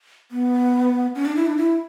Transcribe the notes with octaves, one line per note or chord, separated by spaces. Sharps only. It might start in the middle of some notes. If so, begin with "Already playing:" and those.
B3
C#4
D4
E4
D4
E4